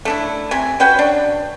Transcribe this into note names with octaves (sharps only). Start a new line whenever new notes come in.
A3 D4 E4
C3 G#5
C#4 F#4 B4 G5
D4